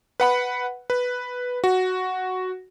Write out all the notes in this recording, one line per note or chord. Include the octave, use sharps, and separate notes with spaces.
B4 F#5 B5
B4
F#4